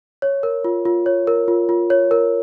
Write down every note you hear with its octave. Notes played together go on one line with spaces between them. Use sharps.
C#5
A#4
F4
F4
C#5
A#4
F4
F4
C#5
A#4